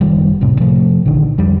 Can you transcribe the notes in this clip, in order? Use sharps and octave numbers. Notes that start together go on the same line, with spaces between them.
F#1 D#3 G3
F1 C2 A2 C3
C3 F3 A3
A#1 D3 D#3
F2 G3